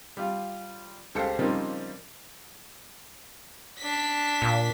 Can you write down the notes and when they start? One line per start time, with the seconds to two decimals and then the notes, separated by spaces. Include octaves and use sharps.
0.17 G3 F4
1.15 C#2 G4 A4 C5 F5 C#7
1.39 C#3 F3 G3 A#3 C4 D#4
3.79 D4 B6
4.42 A#2